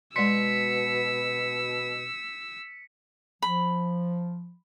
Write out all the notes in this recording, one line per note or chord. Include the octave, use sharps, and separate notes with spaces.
B2 G#3 D5 C6 E6 B6 C#7
F3 B5